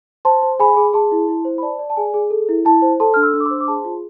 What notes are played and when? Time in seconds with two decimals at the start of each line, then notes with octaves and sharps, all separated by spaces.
0.25 C5 A5 C6
0.43 C5
0.59 G#4 G#5 B5
0.76 G#4
0.93 G#4 A5 C6
1.12 E4
1.28 E4
1.45 C5
1.58 B5
1.62 D5 A5
1.79 D5
1.90 A5
1.97 G#4 G#5
2.14 G#4
2.30 A4
2.49 E4
2.65 E4 A5
2.82 C5
3.00 A4 A5 C6
3.14 D4 F6
3.22 C6 E6
3.33 D4
3.40 D6
3.46 C5 C6 E6
3.60 D6
3.68 G#4 A5 C6
3.85 F4